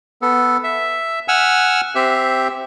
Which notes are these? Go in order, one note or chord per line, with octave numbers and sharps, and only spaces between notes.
B3 A4
E5
F#5 G#5 E6 F6
C4 G4 E5